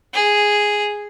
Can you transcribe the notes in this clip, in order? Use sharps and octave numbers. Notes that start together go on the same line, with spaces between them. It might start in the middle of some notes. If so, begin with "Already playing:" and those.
G#4